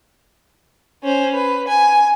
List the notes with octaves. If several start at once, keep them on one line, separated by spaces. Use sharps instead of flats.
C#4 C5
B4
G#5